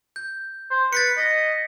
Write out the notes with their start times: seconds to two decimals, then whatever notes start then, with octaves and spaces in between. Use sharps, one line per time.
0.16 G6
0.71 C5
0.93 B4 A6 B6 C#7
1.17 D#5